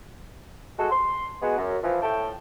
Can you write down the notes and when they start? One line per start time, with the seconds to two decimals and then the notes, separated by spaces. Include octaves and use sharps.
0.78 G#3 F#4 A4
0.90 C6
1.41 G#3 B3 F#4 G#4
1.57 F#2
1.83 E3 F3
2.02 A2 A3 G5 A5